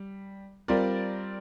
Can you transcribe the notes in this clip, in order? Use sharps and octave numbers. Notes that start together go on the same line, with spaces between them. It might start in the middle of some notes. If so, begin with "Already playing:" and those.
Already playing: G3
G3 C4 F4 A#4 D5